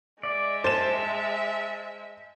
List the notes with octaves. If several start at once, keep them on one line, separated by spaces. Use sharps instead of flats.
G#3 D5 E5
C5 A5 E7